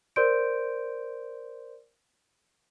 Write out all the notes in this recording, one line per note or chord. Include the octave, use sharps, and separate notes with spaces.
A#4 C5 D5 C6 G6 D7